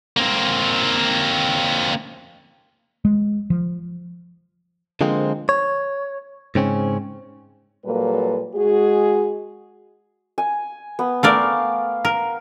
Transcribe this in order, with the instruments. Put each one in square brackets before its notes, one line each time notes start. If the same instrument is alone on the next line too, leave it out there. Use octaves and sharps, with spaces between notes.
[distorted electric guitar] A#3 C4
[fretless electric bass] G#3
F3
[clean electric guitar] D3 F3 G#3 A#3 C4
C#5
G#2 C#3 C4 C#4
[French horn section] A#2 F#3 G3 A#3 A4 B4
G#3 F#4 G#4
[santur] G#5
B3
[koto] A3 A#4 D5 [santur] F5
[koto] A#4